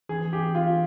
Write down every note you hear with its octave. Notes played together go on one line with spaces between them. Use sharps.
E3 G#4
G4
F4